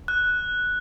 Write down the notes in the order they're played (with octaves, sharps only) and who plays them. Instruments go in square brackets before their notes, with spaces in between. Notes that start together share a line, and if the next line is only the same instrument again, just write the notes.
[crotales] F#6